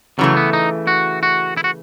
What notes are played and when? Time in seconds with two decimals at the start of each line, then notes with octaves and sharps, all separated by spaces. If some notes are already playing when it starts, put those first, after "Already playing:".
0.19 C#3 E3 F#3 A3
0.37 B3
0.53 D#4
0.87 F#4
1.23 F#4
1.57 E4
1.64 F#4